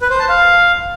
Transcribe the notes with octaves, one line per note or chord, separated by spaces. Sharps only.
B4
C5
A5
F5